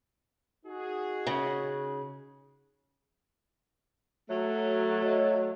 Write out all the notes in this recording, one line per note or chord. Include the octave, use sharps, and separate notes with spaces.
D#4 F#4 G#4
C#3
F#3 A3
C#5 D#5